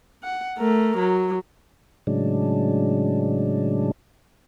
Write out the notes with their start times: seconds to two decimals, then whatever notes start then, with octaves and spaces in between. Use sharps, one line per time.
0.23 F#5
0.59 A3 A#4
0.98 F#3
2.07 A2 C#3 F#3 G#3 D4